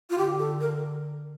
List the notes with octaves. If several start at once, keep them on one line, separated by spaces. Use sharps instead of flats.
F4
D3 G4
A4
A#4